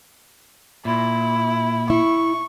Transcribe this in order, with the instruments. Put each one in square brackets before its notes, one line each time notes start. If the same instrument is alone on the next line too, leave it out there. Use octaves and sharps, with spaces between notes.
[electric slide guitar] A#2 [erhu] E4
[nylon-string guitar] E4 [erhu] C#6